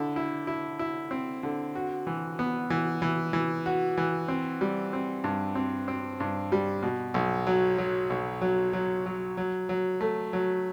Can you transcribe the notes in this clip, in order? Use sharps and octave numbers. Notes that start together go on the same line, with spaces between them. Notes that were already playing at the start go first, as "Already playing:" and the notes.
Already playing: D3 E4
E4
E4
E4
C4
D3
F#4
E3
B3
E3
E3
E3
F#4
E3
C4
G3
C4
G2
C4
C4
G2
G3
B2
B1
F#3
F#3
B1
F#3
F#3
F#3
F#3
F#3
A3
F#3